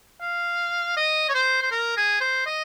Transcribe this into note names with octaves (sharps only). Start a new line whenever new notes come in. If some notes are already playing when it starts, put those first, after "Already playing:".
F5
D#5
C#5
C5
C5
A#4
G#4
C5
D#5